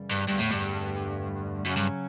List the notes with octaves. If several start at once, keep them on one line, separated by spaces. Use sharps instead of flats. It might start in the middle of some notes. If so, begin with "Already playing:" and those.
Already playing: F#2 C#3 E3 G3
G2
E2 G2 D3 A3
A2
G2
F#2 C#3 F#3 C#4
G2